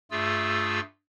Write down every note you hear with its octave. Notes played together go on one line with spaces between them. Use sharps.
G2 A3 F4 G#4 E6